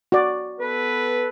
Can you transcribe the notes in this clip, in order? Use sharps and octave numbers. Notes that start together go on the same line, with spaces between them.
F#4 D5
B3 A4 B4